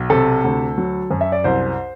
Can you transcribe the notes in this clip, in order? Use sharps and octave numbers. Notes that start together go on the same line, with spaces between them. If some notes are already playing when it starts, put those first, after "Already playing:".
Already playing: B1
C3 A4
D2
F#3
F#2
E5
D5
C2 C5